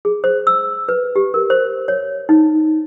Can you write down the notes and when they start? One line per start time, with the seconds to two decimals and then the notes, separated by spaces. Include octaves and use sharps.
0.05 G#4
0.24 C5
0.47 E6
0.89 B4
1.16 G4
1.34 A#4
1.50 C5
1.88 C#5
2.29 D#4